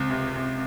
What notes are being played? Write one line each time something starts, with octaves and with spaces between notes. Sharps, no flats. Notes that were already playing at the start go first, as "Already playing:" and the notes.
Already playing: C#2 C4
C3
C3